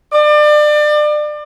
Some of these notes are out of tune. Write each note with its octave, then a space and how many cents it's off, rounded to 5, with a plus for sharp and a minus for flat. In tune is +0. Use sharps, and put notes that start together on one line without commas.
D5 +30